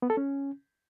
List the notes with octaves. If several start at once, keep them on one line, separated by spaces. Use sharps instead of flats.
B3
A4
C#4